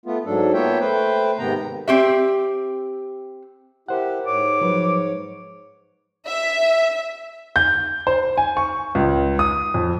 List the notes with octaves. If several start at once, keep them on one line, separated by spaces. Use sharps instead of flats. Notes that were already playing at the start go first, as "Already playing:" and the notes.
A3 B3 F4
G#2 F#3 D4 A4
A#3 B3 F4 C#5 E5 G5
A3 B4 C5 G5
G#2 C3 D#3 B3 G5 A#5
C4 G4 E5
E4 G4 A#4 C5 F#5
G#2 C#5 D6
F3 F#3 B4
E5
G6
C5
G#5
C#6
C#2
D#6
F2